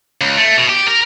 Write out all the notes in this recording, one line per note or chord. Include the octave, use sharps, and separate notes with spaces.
C#2
A3
B2
G4
A#4